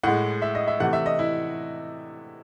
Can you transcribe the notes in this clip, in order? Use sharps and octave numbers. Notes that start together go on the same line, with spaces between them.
A2 G#3 F#5
E5
D#5
E5
C3 E3 A3 F#5
E5
D#5
E4